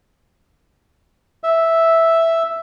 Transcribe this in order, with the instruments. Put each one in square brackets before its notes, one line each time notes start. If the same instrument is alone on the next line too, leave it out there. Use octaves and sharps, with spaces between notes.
[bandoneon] E5